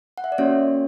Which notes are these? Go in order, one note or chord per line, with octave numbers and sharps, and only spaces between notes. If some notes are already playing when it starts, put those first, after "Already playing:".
F#5
E5
D5
A#3 C#4 F#4 C#5